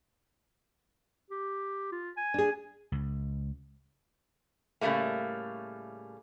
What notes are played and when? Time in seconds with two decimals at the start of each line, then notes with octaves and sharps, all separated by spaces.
1.31 G4
1.92 F4
2.17 G#5
2.34 D4 G#4
2.92 C#2
4.81 A2 C#3 G3 A3 A#3